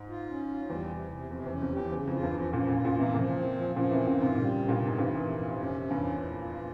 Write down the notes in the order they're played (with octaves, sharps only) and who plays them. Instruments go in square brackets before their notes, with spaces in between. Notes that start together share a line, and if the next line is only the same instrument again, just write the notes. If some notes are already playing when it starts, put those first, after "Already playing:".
Already playing: [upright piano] G#2
[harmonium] F4
C#4
F4
[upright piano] E2 [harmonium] G3
[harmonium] C3
C3
[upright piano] F2 [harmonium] C3
[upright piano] E2
[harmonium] C#4
[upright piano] F2
[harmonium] G4
[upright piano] E2
[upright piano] E2 [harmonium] C#3
[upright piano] F2
[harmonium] F4
[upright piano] E2 G2
[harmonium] F3
[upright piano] F2
[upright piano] A#2 C#3 [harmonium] F3
[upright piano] A#2 C#3
[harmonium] F4
[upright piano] A#2 C#3
[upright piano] C3 E3 [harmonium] A#3
[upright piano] A#2 C#3 [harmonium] F3
[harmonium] C4
F3
[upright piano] A#2 C#3 [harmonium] F3
[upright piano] C3 E3
[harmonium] C4
[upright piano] A#2 C#3
[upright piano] G#2 C3 [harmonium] F4
[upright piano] A#2 C#3 [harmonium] G3
[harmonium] C3
[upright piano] G2 A#2
[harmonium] C3
[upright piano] G#2
[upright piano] G2 A#2 [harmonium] E3
[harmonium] C3
[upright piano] F2
[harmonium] C3
[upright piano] F2 [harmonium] C#4
[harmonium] C#4
[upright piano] E2 G2
[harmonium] F4
A#2
F4